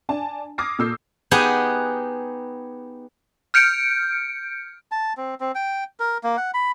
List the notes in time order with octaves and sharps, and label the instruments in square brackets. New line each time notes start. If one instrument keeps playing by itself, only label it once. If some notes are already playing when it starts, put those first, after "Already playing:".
[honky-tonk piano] D4 D5 G#5 A5
D6 D#6 F6 G#6 A#6 C7
A#2 A4 E6 G6 C7
[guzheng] B3 D#4 G4 G#4 F#5 G#5
[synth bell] F6 G6 C#7 D7
[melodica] A5
C4
C4
G5
A#4
A#3
F#5
B5